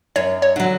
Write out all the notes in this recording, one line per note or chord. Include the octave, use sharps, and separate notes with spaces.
F#2 C#5
C#5
D3 F#3